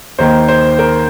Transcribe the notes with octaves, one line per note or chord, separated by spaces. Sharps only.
D#2 D#3 A#3 C5
C5
A#4